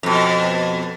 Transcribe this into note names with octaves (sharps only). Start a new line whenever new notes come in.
F2 B2